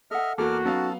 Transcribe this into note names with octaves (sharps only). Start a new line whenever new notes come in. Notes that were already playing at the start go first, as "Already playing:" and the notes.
A4 D#5 E5 F#5 F6
E2 A#3 F#4 A4 D6 F6
F#3 B3 C#4 D#4 A4 F5 A5